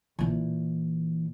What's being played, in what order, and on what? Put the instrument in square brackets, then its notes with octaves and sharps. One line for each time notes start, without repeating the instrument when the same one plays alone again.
[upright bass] A#2 E3